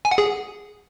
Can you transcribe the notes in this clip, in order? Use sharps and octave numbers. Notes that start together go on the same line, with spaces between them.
G#5
F#5
G#4